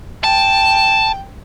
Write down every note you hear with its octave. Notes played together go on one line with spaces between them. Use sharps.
G5 A5